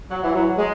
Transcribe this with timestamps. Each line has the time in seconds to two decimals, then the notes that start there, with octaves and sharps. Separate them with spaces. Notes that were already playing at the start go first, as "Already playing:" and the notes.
0.10 F#3
0.23 E3
0.35 F#3
0.58 G#3